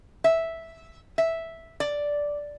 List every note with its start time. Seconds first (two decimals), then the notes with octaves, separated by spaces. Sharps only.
0.24 E5
1.18 E5
1.80 D5